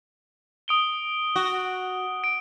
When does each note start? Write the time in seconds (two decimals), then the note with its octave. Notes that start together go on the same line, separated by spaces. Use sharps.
0.68 D#6 D7 G7
1.36 F#4
2.24 D7